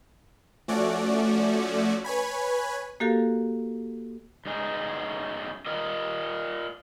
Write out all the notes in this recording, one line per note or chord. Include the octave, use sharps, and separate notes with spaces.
F3 A3 C#4 F#4 D5
B4 C#5 G#5 B5
A#3 F#4 G4 A4 A#4 F5
F#2 D#4 G#4
F4 A#4 D#5